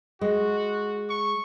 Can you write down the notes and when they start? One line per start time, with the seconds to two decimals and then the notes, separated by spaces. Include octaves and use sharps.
0.21 G#3 F#4
1.10 C#6